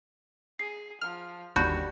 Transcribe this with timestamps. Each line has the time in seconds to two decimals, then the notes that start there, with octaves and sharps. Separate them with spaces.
0.59 G#4 C7
1.01 F3 F6
1.56 G1 D#2 G3 F#4 A5 B5 G6